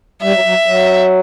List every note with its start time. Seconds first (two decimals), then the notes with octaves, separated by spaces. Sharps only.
0.22 G3 E5
0.34 F#3
0.45 F#3
0.66 F#3